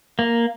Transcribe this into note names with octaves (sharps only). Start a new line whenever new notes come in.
A#3